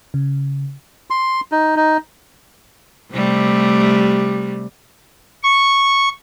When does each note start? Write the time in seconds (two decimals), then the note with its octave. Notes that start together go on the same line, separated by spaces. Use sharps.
0.14 C#3
1.10 C6
1.52 D#4
1.76 D#4
3.13 C3 G3 A3
5.43 C#6